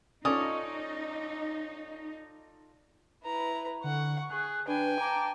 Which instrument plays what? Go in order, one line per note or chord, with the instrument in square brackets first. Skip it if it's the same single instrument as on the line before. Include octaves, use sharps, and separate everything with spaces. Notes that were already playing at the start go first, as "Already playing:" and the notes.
[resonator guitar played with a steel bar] C#4 [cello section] D#4 [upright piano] F4 A4 D5 [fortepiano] D#6
[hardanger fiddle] E4 A#5 [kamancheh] B4
[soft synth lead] D3 [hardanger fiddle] F#5 [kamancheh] C#6
[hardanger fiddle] G#4 [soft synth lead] F#6
[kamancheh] D4 [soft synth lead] B4 [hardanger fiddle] G5 G#5
[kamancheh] A5 D6 [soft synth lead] A#5